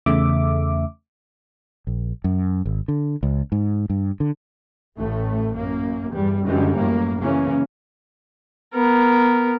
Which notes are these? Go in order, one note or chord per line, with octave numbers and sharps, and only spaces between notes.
E2 C#3 A3 E5 D6
A#1
F#2
G#1
D3
C#2
G#2
G2
D3
A1 A2 A3
F#2 A#3
E2 G2 G3
F#2 D3 E3 G3 G#3
F#2 A2 A#3
C#3 E3 A#3 C#4
B3 A#4